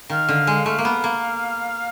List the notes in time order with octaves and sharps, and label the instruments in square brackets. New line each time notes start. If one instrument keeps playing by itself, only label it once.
[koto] D#3 [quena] F5
[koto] D3
G#3
[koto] A3 [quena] F5
[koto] A#3
B3
A#3